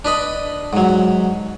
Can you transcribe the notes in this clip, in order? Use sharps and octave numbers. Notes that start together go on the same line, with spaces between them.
D4 B4 D#5 B5
G#2 F#3